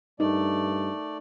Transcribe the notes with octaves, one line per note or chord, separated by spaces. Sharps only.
G2 A3 D#4 A#4 D5